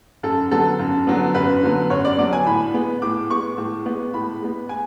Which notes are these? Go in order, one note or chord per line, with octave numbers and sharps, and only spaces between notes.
F#2 A4
D3 F#3 B3 A4
F#2
D3 F#3 B3
F#2 B4
D3 F#3 B3
F#2 C#5
D5
D3 F#3 B3 D5
G#5
A2 B5
G#3 B3
A2 D6
G#3 B3 C#6
A2
G#3 B3
A2 B5
G#3 B3
G#5